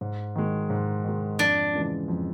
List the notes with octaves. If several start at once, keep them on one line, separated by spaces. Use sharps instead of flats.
G#2
D#3 G#3
G#2
D#3 G#3
F2 D4
C#3 E3 G#3
F2